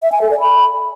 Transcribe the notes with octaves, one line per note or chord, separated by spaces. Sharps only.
E5
G#5
A4
D5
B5